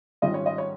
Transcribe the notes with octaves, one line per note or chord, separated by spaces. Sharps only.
G#2 D#3 G3 C#4 F4 D#5
C#5
D#5
C#5